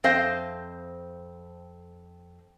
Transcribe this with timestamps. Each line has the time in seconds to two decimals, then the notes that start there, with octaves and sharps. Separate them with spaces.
0.04 F2 C4 C5 D#5 F5